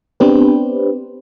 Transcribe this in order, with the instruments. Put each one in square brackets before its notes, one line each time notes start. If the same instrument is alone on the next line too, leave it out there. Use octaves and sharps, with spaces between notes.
[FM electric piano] B3 C4 D4 G4 B4 C5